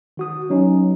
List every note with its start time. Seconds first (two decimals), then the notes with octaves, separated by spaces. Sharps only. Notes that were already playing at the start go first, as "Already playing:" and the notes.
0.17 D#3 F#4 D#6
0.50 F#3 C#4 D#4